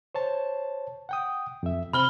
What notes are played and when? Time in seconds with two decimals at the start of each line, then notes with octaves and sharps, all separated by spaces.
0.15 C5 C#5 A5
1.09 F#5 G5 D#6
1.63 F2 E5
1.93 C3 C4 B5 F6 G7